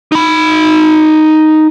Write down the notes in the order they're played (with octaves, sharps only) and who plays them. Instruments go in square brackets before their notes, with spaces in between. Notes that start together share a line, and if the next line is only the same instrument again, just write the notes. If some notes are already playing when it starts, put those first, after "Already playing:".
[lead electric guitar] D#4 B5